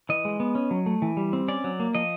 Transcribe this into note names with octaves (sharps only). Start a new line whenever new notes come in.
E3 D#5
G#3
B3
C#4
F#3
A3
E3
G3
C4
C#4 D5
F#3
A#3
F3 D#5